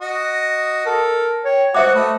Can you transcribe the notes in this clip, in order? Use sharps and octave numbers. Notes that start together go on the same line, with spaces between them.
F#4 D#5
A4 A#4
C#5 G5
F#4 C5 D#5 E5 F#5 C#6 D6
A3 A4 B4 D#5